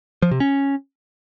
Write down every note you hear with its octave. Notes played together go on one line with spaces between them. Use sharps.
F3
C3
C#4